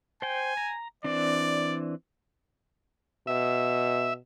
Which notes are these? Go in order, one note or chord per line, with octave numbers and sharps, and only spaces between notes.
C5 G5 G#5
A#5
E3 C4 D4 D5
B2 E5